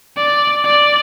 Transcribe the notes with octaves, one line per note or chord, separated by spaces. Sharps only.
D5
D5